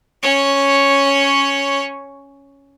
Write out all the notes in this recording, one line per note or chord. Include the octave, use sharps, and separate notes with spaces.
C#4 C#5